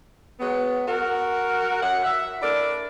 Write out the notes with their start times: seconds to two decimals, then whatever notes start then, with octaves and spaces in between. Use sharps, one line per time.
0.40 F#3 G#3 B3
0.88 F#4 A#4
1.83 F#2 F#5
2.04 E5
2.42 D4 E4 A4 A#4 D5